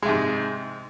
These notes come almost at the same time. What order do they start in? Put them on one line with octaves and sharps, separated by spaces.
G#3 C3 G#2